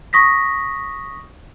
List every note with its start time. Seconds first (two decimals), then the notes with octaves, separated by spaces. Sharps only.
0.13 C#6 D#6 A#6 B6